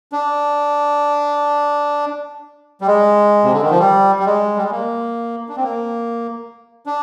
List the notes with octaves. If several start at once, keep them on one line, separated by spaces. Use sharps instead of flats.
D4
G3
G#3
C3
D3
D#3
F3
G3
G3
G#3
G3
G#3
A#3
D4
C4
A#3
D4